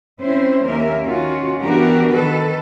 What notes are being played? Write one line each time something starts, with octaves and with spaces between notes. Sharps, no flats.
C4 C#4 E4 C5
D#2 A#3 C#4 A#4 E5
D#3 C#4 F4 F#4
E3 B3 D4 F#4 G4 A#4
D#3 A4 B4